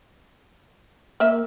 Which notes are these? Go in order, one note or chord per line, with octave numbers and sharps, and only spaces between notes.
A#3 A#4 D#5 E5